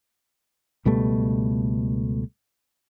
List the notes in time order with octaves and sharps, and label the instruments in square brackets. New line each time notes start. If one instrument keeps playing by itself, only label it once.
[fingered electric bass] C#2 B2 G3 A3